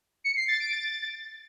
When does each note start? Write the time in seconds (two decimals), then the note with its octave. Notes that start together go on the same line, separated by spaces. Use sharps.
0.24 C#7
0.36 C7
0.48 A6
0.60 D7
0.72 A6